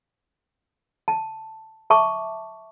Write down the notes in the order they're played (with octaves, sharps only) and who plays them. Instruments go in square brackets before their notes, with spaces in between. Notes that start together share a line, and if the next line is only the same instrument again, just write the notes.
[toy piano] A5
E5 A5 C#6 D6